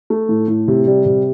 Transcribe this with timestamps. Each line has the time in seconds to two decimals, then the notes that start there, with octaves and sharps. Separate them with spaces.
0.10 A3
0.29 A2
0.48 A2
0.68 C3
0.87 G3
1.06 C3